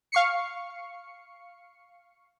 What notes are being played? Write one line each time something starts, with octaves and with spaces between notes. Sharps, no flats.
F5 C#6 C7 C#7